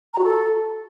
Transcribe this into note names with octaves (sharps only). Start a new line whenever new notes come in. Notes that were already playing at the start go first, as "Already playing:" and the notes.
A#5
F#4
A4